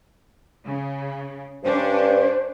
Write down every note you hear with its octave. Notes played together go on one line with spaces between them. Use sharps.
C#3
G2 C#4 D4 C5